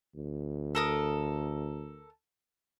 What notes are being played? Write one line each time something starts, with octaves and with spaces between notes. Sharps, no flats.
D2
A4 A#4 D#6